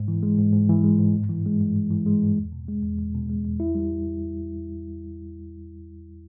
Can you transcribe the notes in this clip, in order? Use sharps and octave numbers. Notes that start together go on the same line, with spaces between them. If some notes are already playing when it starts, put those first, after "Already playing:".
Already playing: G#2
E3
G#3
G#2
G#2
E3
G#3
G#2
G2
E3
G#3
G2
G2
E3
G#3
G2
E2
B2
G#3
E2
E2
B2
G#3
E2
E4
G3